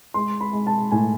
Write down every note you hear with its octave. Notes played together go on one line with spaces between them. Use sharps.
G#3 C6
B5
G#3
A5
A2 G#5